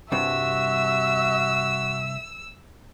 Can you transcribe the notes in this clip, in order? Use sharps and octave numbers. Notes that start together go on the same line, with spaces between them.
C2 G2 C3 F#4 E5 E6